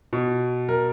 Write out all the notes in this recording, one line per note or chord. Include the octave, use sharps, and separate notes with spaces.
B2
A#4